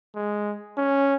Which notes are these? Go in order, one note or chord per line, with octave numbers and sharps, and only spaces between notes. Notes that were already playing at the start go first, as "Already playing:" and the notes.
G#3
C#4